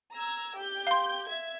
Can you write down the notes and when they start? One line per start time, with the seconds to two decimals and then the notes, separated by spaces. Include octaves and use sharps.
0.12 A#5 E6 G#6
0.56 G4 G6
0.87 F5 C6
1.27 E5 G#6